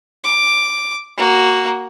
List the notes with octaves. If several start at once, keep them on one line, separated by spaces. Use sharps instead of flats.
D6
A#3 F#4